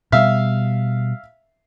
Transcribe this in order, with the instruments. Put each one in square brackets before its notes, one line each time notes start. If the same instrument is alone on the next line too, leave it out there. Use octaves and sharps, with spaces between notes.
[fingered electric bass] B2 G3 [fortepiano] E5 F5